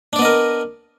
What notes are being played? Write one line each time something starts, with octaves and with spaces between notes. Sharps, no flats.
B3 D4 A#4 D5 D#5